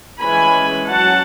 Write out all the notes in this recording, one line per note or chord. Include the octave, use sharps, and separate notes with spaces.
E3 G#3 C#4 G#5 B5
F#3 C#4 F#5 A5